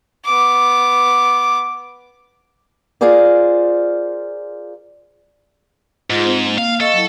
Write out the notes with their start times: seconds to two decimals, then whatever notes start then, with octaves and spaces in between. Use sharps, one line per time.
0.25 B3 D6
3.01 F4 G#4 A#4 C5 D5
6.10 G#2 F4 G#4
6.25 C4 C5
6.46 A#3
6.58 F5
6.80 A4 D#5 F5 C#6
6.94 F#3 E4